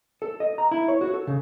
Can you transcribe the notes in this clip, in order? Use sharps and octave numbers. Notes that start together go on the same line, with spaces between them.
A4
D#5
A#5
E4
C#5
F#4
A4
C#3